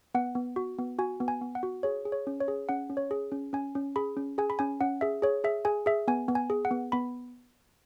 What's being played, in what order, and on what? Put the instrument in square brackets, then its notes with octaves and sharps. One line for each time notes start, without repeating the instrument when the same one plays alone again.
[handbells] B3 F#5
B3
F#4
B3
F#4 G#5
B3
G#5
B3
F#5
F#4
G#4 C#5
G#4
C#5
C#4
C#5
G#4
C#4 F#5
C#4
C#5
G#4
C#4
C#4 G#5
C#4
G#4 B5
C#4
G#4 G#5
B5
C#4 G#5
C#4 F#5
G#4 E5
G#4 C#5
G#4 E5
G#4 G#5
G#4 E5
B3 G#5
B3
G#5
G#4
F#5
B3
B3 B5